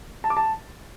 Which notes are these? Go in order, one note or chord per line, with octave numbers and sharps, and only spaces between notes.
A5
D6
A5